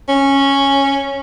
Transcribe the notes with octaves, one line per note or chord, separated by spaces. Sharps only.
C#4